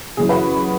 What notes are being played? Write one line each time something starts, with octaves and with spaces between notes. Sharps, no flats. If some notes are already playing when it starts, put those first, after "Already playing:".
F#2 C#3 E3 G#4
F#4 B4